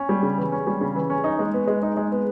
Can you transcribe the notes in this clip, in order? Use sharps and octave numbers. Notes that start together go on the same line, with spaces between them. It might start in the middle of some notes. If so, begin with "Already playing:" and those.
Already playing: C#4
G3
C#3
E3
C#4
G3
C#3
E3
C#4
D#4
G#3
B3
G#3
D#4
G#3
B3